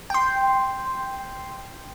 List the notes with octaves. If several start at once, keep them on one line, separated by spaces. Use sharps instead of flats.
G5 C6